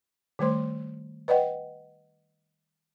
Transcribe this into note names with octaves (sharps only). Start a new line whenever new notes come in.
D#3 G3 A3 C5 C6
B4 D5 D#5 F#5 G5